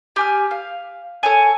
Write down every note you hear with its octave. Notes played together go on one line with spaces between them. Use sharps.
G4 G#5 F6
F5
A4 C#5 G#5